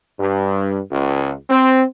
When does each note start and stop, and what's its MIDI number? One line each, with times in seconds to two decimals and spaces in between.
0.19 0.78 43
0.90 1.32 37
1.49 1.83 60